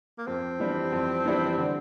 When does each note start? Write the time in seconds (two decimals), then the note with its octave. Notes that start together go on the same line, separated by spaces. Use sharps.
0.18 A#3
0.27 F2 C4
0.60 E3 G3 D4
0.92 F2
1.25 E3 G3 D4
1.58 D3 C4